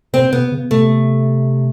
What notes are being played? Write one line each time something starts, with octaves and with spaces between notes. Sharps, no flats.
C3 C4
C3 B3
C#3
C3 A3